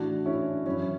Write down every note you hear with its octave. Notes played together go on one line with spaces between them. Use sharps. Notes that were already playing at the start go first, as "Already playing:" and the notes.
Already playing: A2 E3 D4 F#4
C#4 E4
F#2 E3 C#4 E4